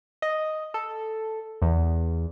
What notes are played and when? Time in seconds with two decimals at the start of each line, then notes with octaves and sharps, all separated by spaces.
0.22 D#5
0.74 A4
1.62 E2